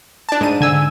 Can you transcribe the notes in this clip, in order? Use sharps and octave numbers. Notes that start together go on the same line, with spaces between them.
D4 A5
G#2 D#7
D3 G#5 E6